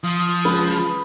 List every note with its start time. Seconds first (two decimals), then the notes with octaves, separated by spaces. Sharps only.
0.04 F3 D#6
0.45 C#2 B4